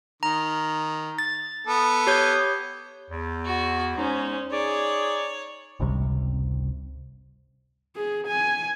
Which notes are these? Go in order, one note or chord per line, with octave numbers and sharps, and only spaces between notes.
D#3 A#5
A6
B3 A4
G4 C#5 G6
E2
F#4
E2 G#3 C#4 D#4 C5
D#4 G#4 C#5 D5
G#1 C#2 C3 G3
G#4
G#5